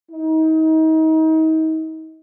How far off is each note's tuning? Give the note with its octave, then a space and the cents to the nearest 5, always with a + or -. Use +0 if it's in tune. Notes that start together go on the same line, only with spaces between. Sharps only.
D#4 +35